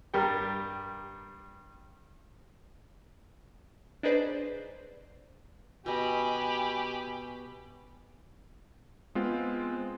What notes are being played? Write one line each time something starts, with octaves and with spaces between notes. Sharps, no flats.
G2 G3 A#4 G5
D4 D#4 G#4 B4 C5 D5
B2 G4 D#5 G#5 B5
G#3 B3 C4 F4